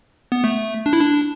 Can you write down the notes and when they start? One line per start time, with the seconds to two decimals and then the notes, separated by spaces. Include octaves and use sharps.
0.32 B3
0.44 A3
0.86 D4
0.93 E4
1.01 D4